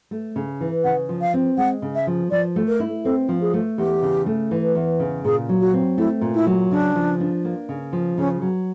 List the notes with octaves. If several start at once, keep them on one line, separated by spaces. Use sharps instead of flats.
A3
C#3
E3
C#3 F#5
F3
F5
C4
G#3 F#5
C#3
E5
F3
F3 D5
A3
A#4
E4
C4 A4
F3
G#4
A3
E2 G4
C#3
A3
E3
E2
C#3
A#2 G#4
F#3
F#4
C4
A3 E4
A#2
E4
F#3
C#3 D4
F3
D4
A#3
C#3
F3
C#3 C#4
F#3